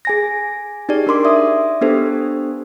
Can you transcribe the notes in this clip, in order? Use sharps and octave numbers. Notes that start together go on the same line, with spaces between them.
G#4 G#5 A#6
D#4 G4 G#4 D5
D4 A#4 C6 D6
D5 E5 D#6
B3 D4 G4 A4 C5